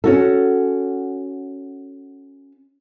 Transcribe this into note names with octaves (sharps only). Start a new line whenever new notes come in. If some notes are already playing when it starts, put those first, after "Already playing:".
C#4 F#4 A4